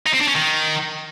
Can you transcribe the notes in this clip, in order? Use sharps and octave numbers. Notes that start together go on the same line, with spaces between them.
D#4
C4
D4
C#4
D#3